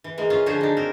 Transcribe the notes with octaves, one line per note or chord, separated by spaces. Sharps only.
E3
E3 G#3 A#3
C#4 F4 G#4
D3 F3 F#4 G#4 C5 C#5
D4 D#4
C4 A#4